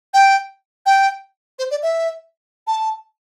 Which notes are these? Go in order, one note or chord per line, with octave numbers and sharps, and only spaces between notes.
G5
G5
C5
D5
E5
A5